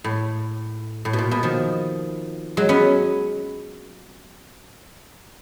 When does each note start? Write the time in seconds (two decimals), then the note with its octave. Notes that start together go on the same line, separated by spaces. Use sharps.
0.04 A2
1.05 A2
1.13 B2
1.18 A#2
1.31 B2
1.43 D#3 F3
2.57 F#3 G#3
2.69 B3 C#4